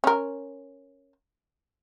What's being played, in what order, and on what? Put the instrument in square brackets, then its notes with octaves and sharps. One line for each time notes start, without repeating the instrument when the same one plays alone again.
[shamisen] C#4 A#4